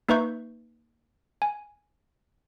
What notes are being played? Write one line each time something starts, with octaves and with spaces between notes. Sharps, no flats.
A#3 D#4 B4 E5 C#6 G6
G#5